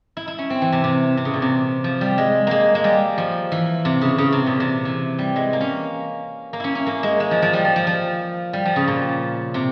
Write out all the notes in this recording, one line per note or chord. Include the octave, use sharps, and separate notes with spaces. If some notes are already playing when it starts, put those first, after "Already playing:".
E4
E4
C#4
C4
E3
C3
C3
C3
C#3
A#2
C3
F3
G3
G#3
G#3 A#3
G#3
G3
F3
E3
C3
C#3
C#3
C3
A#2
C3
E3
G3
G#3
A#3
C#4
A#3
C#4 E4
C#4
A#3
G#3
G#3
F3
F3
G3
F3
F3
F3
G3
F3
C#3
A#2
C3